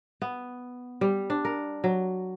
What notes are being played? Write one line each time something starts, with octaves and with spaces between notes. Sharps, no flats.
B3
G3
D4
A#4
F#3